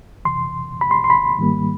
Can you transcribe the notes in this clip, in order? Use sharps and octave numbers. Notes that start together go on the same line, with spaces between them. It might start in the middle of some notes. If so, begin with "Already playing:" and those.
F2 C3 E3 C6
B5
C6
C6
B5
G#2 D#3 G3 A#3